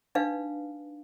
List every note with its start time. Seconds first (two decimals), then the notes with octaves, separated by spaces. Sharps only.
0.15 D4 D#4 B4 F5